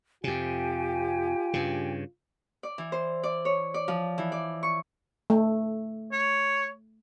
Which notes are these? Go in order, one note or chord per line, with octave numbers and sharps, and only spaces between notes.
F2 C3 F4 G4 G5 G#5
G2 C#3
D5
E3
C5
D5
C#5
D5
F3
E3
D5
C#6
A3
C#5